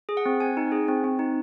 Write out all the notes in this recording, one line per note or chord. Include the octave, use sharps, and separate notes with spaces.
G#4
F#5
C4
C4 G#5
D#4
G#4
C4
C4
D#4